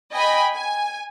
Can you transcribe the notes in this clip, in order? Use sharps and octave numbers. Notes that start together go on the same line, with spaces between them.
D#5 G5 G#5 B5
G#5